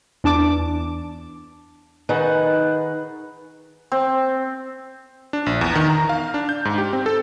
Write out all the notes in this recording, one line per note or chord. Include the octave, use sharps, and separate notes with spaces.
E2 D4 A5 D6
D#3 D#4 G#4 B4 F#5
C4
D4
A#1
E2
D#3
A#5
F5
D4
G6
G#2
G4
C4
A4